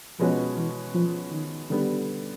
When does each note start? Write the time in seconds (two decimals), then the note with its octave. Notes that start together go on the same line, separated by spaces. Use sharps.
0.19 B2 F3 G#3 C#4 F#4 B4
0.57 E3
0.94 F3
1.32 D#3
1.70 D3 D#3 G3 B3